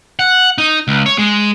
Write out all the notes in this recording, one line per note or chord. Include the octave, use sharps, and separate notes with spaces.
F#5
D#4
C#2
C#5
G#3